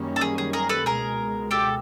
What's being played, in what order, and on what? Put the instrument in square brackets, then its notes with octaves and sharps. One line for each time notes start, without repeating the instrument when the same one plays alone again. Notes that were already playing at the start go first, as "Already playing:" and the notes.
Already playing: [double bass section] F#2 D#3 G3 A#3 C#4
[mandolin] A4
G#4
G#4
G#4 A#4
A4 B4
[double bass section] C#2 B2 G#3 [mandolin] G#4 A#4
[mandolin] G4 A4